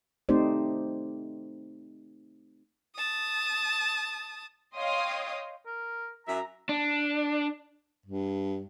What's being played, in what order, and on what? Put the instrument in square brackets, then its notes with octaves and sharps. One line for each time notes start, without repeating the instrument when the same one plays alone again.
[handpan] A3 C4 D#4 G4 C5 D5
[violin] A5 D#6
[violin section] C#5 D#5 F5 G5 C6 D#6
[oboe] A#4
[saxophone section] F#2 E5 [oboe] A#5
[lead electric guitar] D4
[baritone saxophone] G2